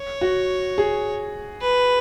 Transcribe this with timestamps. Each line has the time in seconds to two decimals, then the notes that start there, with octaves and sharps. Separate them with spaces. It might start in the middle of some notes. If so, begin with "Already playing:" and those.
Already playing: C#5
0.21 F#4
0.78 G#4
1.61 B4